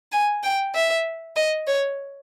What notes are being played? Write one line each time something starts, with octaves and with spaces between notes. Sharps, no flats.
G#5
G5
E5
D#5
C#5